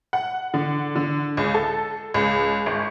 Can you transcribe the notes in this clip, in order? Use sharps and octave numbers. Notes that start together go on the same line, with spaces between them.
F#5
D3
D3
C#2
A4
C#2
G#1